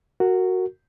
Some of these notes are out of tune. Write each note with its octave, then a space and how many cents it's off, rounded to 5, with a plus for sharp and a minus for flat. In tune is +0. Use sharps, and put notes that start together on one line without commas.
F#4 +0 A#4 -20